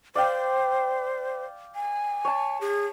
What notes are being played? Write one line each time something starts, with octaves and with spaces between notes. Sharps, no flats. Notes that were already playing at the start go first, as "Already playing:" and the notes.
C5 D5 F5 G5
G#5
C#5 A5
G#4